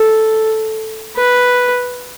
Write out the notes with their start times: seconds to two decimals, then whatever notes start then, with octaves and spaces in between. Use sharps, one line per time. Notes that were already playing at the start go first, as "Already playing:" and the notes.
Already playing: A4
1.17 B4